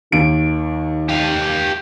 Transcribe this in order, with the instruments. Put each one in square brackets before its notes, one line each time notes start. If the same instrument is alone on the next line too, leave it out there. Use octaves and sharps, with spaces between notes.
[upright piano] D#2 D7 [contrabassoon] D#3
[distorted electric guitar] G4 F5